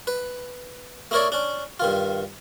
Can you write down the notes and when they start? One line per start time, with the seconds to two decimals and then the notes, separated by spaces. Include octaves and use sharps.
0.07 B4
1.11 A3 D#4 E4 A#4 C#5 D5
1.32 C#4 D4
1.80 G2 D#3 F4